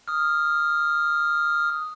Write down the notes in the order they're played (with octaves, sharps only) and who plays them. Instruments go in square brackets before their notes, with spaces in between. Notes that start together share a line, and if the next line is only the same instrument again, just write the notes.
[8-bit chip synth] D#6 F6